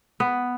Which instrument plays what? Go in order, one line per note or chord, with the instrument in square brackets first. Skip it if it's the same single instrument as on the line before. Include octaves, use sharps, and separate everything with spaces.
[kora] B3